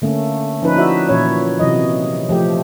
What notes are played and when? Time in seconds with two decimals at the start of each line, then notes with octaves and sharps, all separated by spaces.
0.02 D3 A3 A#3 C#4
0.62 F3 C#4 D#4 B4
0.76 E4 F#4 D5 E5
1.09 A#2 E3 C#4 C#5
1.60 C3 E3 F#3 D#5
2.29 F3 A3 G4